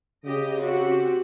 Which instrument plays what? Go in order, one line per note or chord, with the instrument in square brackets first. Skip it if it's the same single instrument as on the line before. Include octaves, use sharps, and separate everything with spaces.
[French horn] C#3 [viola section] G4 D#5
[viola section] C4 F#4 G4